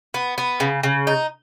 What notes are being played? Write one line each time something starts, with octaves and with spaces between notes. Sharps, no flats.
B3
B3
C#3
C#3
D#4